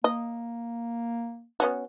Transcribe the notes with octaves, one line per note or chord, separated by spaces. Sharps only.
A#3 D#5
B3 C#4 F#4